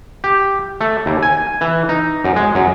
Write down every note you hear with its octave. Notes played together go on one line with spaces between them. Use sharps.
G4
A3
D#2
G#5
E3
D#4
F#2
G#3
F#2